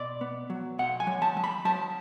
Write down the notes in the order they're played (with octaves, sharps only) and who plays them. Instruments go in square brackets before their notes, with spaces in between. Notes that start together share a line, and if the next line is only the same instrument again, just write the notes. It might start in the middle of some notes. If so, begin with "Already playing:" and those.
Already playing: [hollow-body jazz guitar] B2 D5
B3
F#3
B2 F#5
G#5
F#3
A5
F#3
B5
F#3 A5